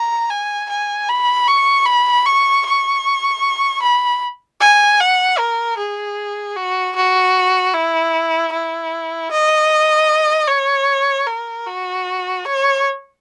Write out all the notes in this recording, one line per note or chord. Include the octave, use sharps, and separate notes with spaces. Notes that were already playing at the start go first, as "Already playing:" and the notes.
Already playing: A#5
G#5
G#5
B5
C#6
B5
C#6
C#6
B5
G#5
F#5
A#4
G#4
F#4
F#4
E4
E4
D#5
C#5
A#4
F#4
C#5